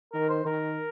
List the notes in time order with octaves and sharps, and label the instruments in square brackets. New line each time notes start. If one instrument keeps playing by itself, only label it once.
[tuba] D#3 [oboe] A#4
[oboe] C5
[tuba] D#3 [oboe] A#4